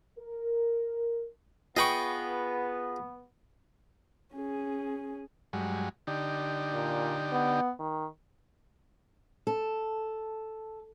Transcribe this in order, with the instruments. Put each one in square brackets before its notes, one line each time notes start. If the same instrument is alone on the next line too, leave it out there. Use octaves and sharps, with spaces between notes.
[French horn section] A#4
[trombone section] B3 [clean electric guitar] F4 G#4 B4 [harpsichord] D#5 G5 C#6
[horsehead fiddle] C#4 G#4
[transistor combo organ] G2 F#3 G#3
D3 D#4 G4
[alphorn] A#2
B3
D#3
[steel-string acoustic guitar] A4